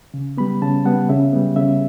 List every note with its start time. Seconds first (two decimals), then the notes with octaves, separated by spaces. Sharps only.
0.14 C#3
0.38 G3 B3 B5
0.62 C#3 A5
0.85 G3 B3 F#5
1.09 C#3 E5
1.33 G3 B3
1.56 C#3 E5